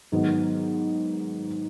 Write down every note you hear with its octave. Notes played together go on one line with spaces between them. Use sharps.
G#2 D#3 F#3 B3 D#4